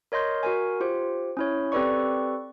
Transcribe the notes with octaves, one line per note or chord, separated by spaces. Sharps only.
A#4 C#5 D#5 C6 G6
F#4 A#4 G#5
F4 G4 C5
C#4 E4 C#5
C4 G4 A4 B4 D5 C#6